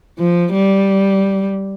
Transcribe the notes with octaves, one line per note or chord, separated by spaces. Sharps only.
F3
G3